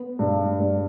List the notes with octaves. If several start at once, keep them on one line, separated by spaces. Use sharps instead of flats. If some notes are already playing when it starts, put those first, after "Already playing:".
Already playing: B3
G2
G2